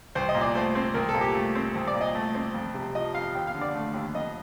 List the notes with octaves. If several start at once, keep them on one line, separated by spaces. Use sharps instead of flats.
C2 C5
D#5
A#2
D5
A3 C5
C4
C2 A#4
A4
A#2
G4
A3
C4
C2
D5
A#2
D#5
A3
C4
F2
C3
F3 D#5
F2 F5
D#2 G5
F5
D3
D5
A3
D#2
F2 D#5